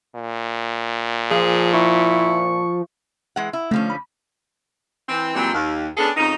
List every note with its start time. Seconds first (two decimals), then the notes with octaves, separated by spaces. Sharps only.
0.15 A#2
1.31 F3 G#4
1.74 E4 C#6
3.36 E3 G#3 F#5
3.53 E4
3.71 D3 F3 A3 C#4
3.90 B5
5.09 E3 C4
5.35 A#2 E3 F#3 G3 C4
5.53 D#2
5.97 B3 C#4 D4 G#4 A4
6.17 F2 C#3 D#4